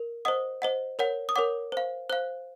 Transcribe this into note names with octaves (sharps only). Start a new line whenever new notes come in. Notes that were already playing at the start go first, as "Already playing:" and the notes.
Already playing: A#4
C5 D#5 F#5 D#6
C5 D#5 F#5
A#4 C#5 F#5
D#6
A#4 C#5 F#5 D6
C5 F5
C5 F5 F#6